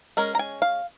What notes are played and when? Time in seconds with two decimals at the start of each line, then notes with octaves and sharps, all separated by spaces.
0.17 G#3 C#4 A#4
0.35 A#5
0.39 G#5
0.62 F5